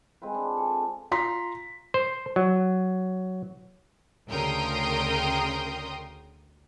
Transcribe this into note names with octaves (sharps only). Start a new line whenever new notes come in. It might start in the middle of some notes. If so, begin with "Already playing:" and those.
G#3 C4 F4 B4
D4
A4 G#5
F4 A#5 C6 B6
C5
F#3
D2 C#3 A#4 G5 C6 D#6